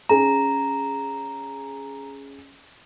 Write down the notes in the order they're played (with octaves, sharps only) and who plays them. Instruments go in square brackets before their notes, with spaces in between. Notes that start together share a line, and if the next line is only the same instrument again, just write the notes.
[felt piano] C#4 G#4 [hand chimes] A#5